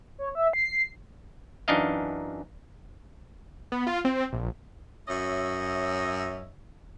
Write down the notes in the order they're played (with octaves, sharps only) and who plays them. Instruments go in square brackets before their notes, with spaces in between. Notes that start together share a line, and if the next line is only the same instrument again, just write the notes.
[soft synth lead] C#5
E5
C7
[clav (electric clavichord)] F#2 E3 D4 D#4 D#5 F5
[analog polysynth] B3
F4
C4
A#1
[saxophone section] F#2 C#5 D#5 E5